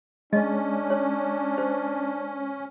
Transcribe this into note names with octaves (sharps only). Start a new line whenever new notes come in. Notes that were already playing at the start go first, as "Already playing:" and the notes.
G#3 C#4 D4 D#5
C#5
C5